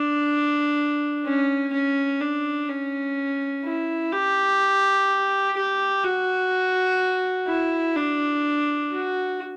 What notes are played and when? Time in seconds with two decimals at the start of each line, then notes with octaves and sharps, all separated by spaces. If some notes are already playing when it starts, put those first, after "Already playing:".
Already playing: D4
1.25 C#4
1.73 C#4
2.21 D4
2.69 C#4
3.65 E4
4.12 G4
5.57 G4
6.04 F#4
7.47 E4
7.96 D4
8.91 F#4